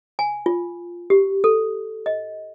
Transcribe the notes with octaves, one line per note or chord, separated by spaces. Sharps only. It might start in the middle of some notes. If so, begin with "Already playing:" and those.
G#5
F4
G4
A4
D#5